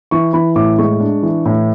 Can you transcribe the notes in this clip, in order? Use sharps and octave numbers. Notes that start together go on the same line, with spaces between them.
E3 C#6
E3 B5
A2 D6
G#3 C#6
D4
E3
A2